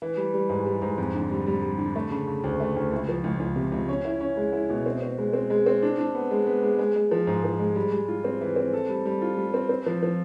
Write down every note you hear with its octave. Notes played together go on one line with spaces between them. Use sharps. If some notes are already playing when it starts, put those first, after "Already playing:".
E3
G3
G3
G#2
G3
G#2
F2
D3
G3
G3
G3
D3
A3
C#3
C#3
D2
A3
D2
C#2
F3
C#2
C#2
C3
C#2
C#4
E4
C#4
G#3
E4
B2
C4
C4
G#3
C4
G#3
C4
D4
D4
B3
G#3
B3
G#3
G#3
G#3
F3
G#2
F3
G#3
G3
G3
F4
C4
E3
C4
A4
G3
G3
F4
G3
C4
C4
F3
F3